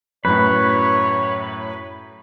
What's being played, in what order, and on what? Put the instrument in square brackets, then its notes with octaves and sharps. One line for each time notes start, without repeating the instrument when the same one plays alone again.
[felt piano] F#2 A2 [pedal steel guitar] B4 [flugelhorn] C#5